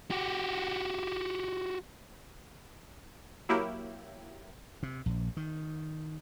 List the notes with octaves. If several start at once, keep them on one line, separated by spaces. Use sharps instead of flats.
F#4 G4
F#3 A#3 E4 G4
C3
A#1
D#3